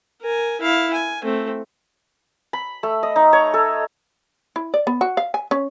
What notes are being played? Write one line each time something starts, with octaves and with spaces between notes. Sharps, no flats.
A#4 G#5
E4 F5
G#5
A3 C4
B5
A3
D#5
D#4
C#5
A4
E4
D5
B3
F#4
F5
G#5
C#4